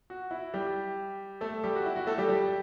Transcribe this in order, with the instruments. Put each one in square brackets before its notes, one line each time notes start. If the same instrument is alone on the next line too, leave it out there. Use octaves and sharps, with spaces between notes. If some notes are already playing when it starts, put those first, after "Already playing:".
[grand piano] F#4
E4
G3 G4
A3 A4
G3 G4
F#4
E4
F#4
A3 A4
G3 G4
G3 G4